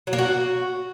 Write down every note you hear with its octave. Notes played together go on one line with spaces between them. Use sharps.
F#3
A#3
F#4